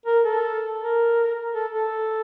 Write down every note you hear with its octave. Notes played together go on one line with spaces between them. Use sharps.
A#4
A4
A#4
A4
A4